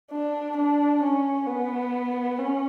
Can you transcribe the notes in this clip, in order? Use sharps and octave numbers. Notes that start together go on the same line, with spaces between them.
D4
D4
C#4
B3
C#4